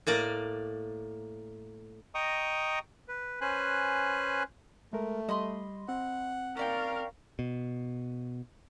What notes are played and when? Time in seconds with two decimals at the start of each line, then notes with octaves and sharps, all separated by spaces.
0.07 A2 A#3 D5 A#5
2.15 D#5 G5 A#5 C#6 D#6
3.08 B4
3.41 C#4 B4 C5 G#5 F#6
4.93 G#3 A3 A#4
5.29 G3 D#5 B5 C6
5.89 C4 F#5
6.57 C#4 A#4 D5 F5 G5
7.39 B2